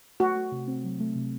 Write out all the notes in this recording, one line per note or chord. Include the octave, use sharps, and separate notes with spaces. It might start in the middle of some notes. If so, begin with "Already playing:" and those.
A3 F#4
A3
C3
C4
F#3
A3
C3